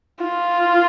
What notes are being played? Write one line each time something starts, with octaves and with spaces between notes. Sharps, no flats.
F4